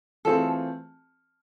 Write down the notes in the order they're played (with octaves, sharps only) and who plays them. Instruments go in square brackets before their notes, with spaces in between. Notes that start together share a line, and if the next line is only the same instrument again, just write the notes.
[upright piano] E3 A3 C4 F4 G#4 [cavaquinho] A4